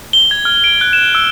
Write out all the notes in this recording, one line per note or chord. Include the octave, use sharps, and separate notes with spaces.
G7
G#6
F6
D7
F#6
E7
E6